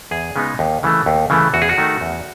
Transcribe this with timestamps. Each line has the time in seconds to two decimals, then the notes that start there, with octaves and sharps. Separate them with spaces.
0.11 E2 G#4
0.36 C#3 G#3 B3 D#4
0.59 D#2
0.83 C#3 E3 A3
1.06 D#2
1.30 C#3 E3 A3
1.54 E2 F#4
1.62 G#4
1.69 F#4
1.78 D#3 A3 D#4
2.01 E2